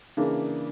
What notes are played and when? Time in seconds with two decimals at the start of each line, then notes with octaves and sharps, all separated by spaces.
0.17 C#3 E3 A#3 D4